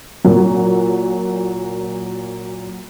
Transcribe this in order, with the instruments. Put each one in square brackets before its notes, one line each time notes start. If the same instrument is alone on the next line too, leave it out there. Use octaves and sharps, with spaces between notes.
[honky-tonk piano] A#2 F#3